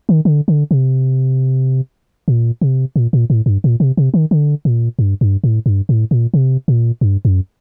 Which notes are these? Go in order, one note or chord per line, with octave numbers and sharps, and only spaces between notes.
D#3
D3
D3
C3
A#2
C3
A#2
A#2
A2
G2
A#2
C3
C3
D#3
D3
A#2
G2
G2
A2
G2
A2
A#2
C3
A#2
G2
F#2